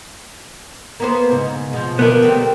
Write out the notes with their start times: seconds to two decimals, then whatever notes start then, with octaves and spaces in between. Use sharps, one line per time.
1.00 A#3 B3 C5
1.31 G#2 C#3
1.73 B2 F3
1.99 D3 F3 B3 A#4
2.22 G3 A3 C4